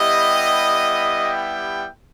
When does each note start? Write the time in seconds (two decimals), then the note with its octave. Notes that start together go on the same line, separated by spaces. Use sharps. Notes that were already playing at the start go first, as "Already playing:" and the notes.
Already playing: G3 B3 E4 G4 D#5
1.25 G5